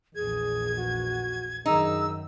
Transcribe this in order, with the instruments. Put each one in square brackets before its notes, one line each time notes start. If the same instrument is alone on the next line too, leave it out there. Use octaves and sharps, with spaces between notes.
[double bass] A#1 E2 [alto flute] G#4 [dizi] G#6
[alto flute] F#4
[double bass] F#2 D#3 [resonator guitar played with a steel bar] D#4 [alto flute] G#4 [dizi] E6